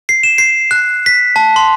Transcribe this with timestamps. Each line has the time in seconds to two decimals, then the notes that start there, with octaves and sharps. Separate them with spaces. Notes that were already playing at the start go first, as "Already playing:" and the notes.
0.09 C7
0.23 E7
0.38 C7
0.71 F#6
1.06 B6
1.36 A5
1.56 C6